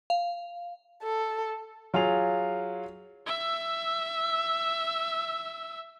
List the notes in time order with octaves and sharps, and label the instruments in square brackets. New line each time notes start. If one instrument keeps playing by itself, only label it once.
[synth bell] F5
[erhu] A4
[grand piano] F#3 F4 G#4 F5 F7
[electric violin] E5 E6